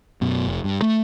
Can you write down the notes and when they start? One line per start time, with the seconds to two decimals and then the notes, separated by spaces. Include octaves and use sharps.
0.21 F#2 B2
0.47 F1
0.64 G2
0.82 A3